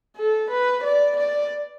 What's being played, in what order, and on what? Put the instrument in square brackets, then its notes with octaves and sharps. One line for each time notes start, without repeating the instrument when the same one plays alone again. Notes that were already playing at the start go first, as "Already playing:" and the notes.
[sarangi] A4
B4
D5
D5